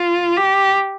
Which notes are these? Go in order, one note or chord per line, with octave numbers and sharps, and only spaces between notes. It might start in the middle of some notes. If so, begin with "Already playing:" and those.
Already playing: F4
G4